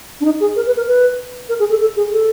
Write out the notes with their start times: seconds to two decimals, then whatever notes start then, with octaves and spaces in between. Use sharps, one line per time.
0.21 D4
0.25 D#4
0.40 G#4
0.56 A#4
0.66 B4
0.77 A#4
0.87 B4
1.49 A#4
1.59 G#4
1.70 A4
1.81 A4
1.96 G#4
2.12 A4